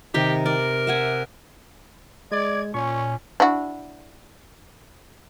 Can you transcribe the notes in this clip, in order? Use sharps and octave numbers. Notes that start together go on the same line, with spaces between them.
C3 D#3 G4 A#4
A#4 D5
E5 F#5 G#5
G#3 D5 G#6
A#2 C#4 C#6
D4 E4 F#4